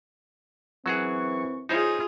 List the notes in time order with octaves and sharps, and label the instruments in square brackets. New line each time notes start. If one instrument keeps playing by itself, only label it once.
[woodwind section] F#2 E3 C#6 [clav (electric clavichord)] F#3 F#4 G#4 [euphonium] C4
[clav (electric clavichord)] D#4 C5 C#5 [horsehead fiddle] F4 G#4